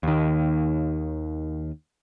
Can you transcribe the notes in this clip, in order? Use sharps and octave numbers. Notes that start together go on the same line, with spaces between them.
D#2 D#3